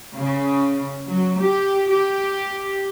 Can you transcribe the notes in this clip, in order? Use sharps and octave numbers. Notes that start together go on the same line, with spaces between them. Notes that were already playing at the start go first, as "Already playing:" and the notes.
C#3
F#3
G4
G4